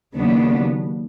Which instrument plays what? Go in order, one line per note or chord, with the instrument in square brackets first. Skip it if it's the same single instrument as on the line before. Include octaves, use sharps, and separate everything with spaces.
[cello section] D#2 C#3 F#3 B3 D4